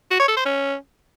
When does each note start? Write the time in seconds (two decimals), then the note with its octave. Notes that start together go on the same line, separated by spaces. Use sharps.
0.11 F#4
0.20 C#5
0.28 A4
0.37 C5
0.45 C#4